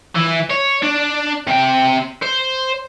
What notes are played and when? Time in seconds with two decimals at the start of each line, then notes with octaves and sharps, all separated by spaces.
0.15 E3
0.50 C#5
0.83 D4
1.47 C3 G5
2.23 C5